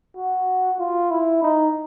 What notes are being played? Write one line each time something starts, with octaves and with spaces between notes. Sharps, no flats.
F#4
F4
E4
D#4